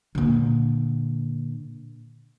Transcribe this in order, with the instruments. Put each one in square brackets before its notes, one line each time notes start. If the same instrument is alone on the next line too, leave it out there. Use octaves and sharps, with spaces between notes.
[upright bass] A#2 D3